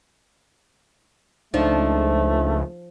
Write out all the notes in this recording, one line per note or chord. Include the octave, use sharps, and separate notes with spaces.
C#2 F3 A3 D4 D#4